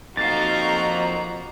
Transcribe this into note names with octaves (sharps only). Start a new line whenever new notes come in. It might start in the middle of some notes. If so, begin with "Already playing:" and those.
F2 A#3 D#4 F#4 F5 A#5 A6